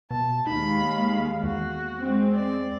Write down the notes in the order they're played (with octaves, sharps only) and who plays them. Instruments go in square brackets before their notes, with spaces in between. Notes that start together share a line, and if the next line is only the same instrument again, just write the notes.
[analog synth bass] B2 [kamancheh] A5
[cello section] D#2 G#3 F5 [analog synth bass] D#4 [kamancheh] B5
[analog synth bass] E2 [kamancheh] F#4
[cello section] G#3 C4
[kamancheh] D5